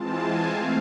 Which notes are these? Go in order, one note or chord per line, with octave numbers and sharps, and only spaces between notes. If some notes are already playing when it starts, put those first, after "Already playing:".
Already playing: E3 G#3 C4 F4 A5
G#5
A3 C4 F5